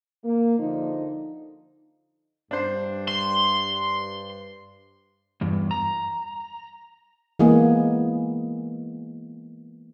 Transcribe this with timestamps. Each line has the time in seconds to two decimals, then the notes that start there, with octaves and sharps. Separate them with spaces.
0.24 A#3
0.59 D3 F3 D#4
2.51 G2 D4 C5
3.08 C6
5.41 E2 G2
5.71 A#5
7.39 E3 G#3 A#3 B3 G#4